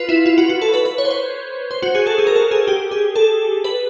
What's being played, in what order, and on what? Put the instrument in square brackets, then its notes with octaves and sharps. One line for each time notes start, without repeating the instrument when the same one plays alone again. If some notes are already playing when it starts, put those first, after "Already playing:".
Already playing: [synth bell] F4 B4
E4
F4
F#4
F#4
A4
B4
B4
C#5
C5
C#5
C5
F#4
G#4
A4
G#4
A#4
A4
G#4
G4
G#4
A4
B4